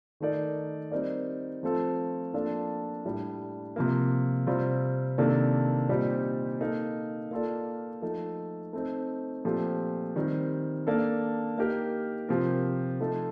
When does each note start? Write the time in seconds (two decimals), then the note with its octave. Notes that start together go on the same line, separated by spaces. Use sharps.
0.20 D#3 A3 D#4 A#4 D5
0.91 G3 C4 D#4 A#4 D5
1.63 F3 A3 C4 F4 A4
2.34 F3 A#3 D4 F4 A4
3.05 A2 G3 D4
3.76 C3 F3 A#3
4.47 C3 G3 C4 F4
5.18 C3 D#3 A#3 D4 A4
5.89 A#2 G3 C4 D#4 G4
6.60 A#3 D#4 A4
7.31 A#3 F4 A4 D5
8.02 F3 A3 D#4 A4
8.73 A3 C4 D#4
9.44 A#2 F3 A3 C4 G4
10.16 D#3 G3 C4
10.87 A#3 D4 A4
11.58 A#3 D#4 G4 A#4
12.29 C3 F3 C4 G4 A#4
13.00 F3 A3 D#4 A4